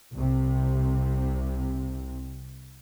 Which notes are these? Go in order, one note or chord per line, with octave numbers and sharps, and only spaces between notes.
C2 C3